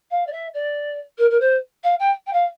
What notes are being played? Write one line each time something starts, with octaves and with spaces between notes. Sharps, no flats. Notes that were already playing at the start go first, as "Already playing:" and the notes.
F5
D5
E5
D5
A#4
A#4
C5
F5
G5
G5
F5